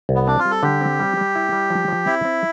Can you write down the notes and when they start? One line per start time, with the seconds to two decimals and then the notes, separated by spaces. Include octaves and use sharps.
0.09 C2
0.15 B3
0.27 C4 D4
0.39 F4
0.45 G3
0.51 A4
0.63 D3 G4
0.81 C4
0.99 G3
1.17 G3
1.35 E4
1.52 G3
1.70 F3
1.88 F3
2.06 C4 E4
2.25 C4